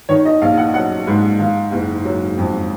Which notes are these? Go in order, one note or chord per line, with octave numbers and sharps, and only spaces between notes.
D#3 C#5
D#5
A#1 F5
F#5
F#3 F#5
G#2
D#3 F5
F#1
F#3
F2